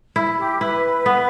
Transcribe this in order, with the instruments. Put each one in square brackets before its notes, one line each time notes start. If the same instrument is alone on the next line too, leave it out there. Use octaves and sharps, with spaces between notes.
[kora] E4
[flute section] G4
[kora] E4 [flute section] B4
[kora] B3